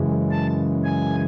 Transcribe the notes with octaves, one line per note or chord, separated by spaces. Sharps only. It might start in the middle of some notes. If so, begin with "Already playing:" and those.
Already playing: F#2 C#3 E3 G#3
A5
G#5